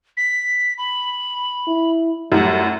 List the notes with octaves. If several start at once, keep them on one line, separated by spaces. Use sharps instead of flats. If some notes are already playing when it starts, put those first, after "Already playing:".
B6
B5
E4
F#2 A2 G3 F#5